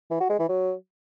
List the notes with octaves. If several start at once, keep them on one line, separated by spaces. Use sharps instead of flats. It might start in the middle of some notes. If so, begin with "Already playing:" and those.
E3
F#4
G#3
E3
F#3